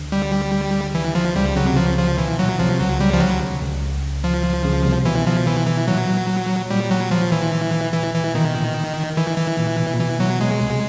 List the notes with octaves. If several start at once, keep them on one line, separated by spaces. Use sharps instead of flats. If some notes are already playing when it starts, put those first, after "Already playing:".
Already playing: D2 D3
G3
E3
F3
C#2 C#3 G3
C#3 F#3
C3
C#2 C#3 F3
F3
B2 E3
A#2 F#3
C2 C3 F3
C3
C#2 C#3 F#3
C#2 C#3 G3
F3
D2 D3 F#3
C2 C3
C#2 C#3
F3
C#2 C#3
C2 C3
B2 E3
F3
E3
E3
A#2 F#3
A#2 G3
F#3
F3
E3
E3
E3
B2 D#3
A#2
E3
E3
A#2
B2
A#2
B2 E3
B2 F#3
B2 G#3
C2 C3